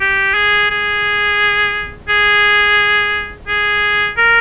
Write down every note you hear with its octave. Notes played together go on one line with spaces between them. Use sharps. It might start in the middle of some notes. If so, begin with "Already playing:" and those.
G4
G#4
G#4
G#4
G#4
A#4